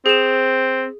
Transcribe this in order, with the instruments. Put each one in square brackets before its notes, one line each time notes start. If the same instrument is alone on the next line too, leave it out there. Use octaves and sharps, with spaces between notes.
[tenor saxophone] C4 [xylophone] G#4 E7